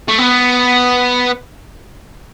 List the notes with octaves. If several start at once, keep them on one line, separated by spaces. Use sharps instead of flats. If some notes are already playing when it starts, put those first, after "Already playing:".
A3
B3